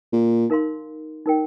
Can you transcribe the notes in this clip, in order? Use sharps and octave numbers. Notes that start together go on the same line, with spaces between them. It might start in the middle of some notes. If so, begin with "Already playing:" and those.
A#2
D#4 A#4 F5 C6
D#4 A#4 G5